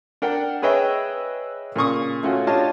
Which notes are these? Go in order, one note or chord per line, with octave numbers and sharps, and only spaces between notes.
D4 A#4 F#5 G5
G#4 B4 C#5 D#5 E5 G5
A#2 C#3 C#6 D#6
A3 C#4 F4 F#4
D4 F4 G4 C#5 D#5 A5